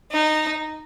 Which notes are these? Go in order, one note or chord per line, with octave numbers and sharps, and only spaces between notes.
D#4